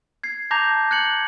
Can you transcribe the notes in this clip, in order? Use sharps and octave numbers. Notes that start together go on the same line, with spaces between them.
G#6 C7
A5 A#5 D6 G6 A#6 F7
F#6 G#6 C#7 F#7